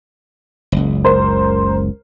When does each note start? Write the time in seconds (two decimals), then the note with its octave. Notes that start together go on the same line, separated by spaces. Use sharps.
0.72 F#1 C#2
1.04 A#4 C5